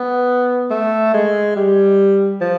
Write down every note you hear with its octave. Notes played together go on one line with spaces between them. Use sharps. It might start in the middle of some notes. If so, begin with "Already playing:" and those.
Already playing: B3
A3
G#3
G3
F3